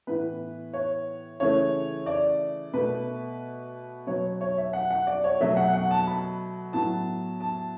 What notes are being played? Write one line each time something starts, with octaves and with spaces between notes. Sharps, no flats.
A2 E3 B3 B4
C#5
C#3 E3 A3 C#5
D5
B2 A3 B4
B2 F#3 B3 C#5
C#5
E5
F#5
F#5
D5
C#5
B2 F#3 A3 E5
F#5
F#5
A5
B5
A2 F#3 B3 A5
A5